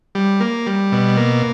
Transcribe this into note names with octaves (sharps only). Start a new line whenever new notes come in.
G3
A#3
G3
B2
A#3